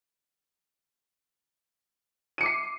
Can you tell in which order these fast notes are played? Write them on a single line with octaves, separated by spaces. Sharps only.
D#7 C#7 D6 C7